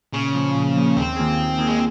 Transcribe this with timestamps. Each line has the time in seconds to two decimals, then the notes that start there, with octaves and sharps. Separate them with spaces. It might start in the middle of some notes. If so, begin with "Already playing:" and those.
0.13 A#2 C#3
0.34 F3 A#3
0.54 A#2
0.76 F3 A#3
0.96 D#2 C4
1.16 D#3 A#3 F4 G#4
1.37 D#2
1.58 D#3 A#3 F4 G#4
1.67 G#3